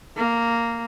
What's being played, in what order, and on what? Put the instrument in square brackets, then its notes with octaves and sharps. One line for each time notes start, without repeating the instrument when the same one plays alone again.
[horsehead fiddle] A#3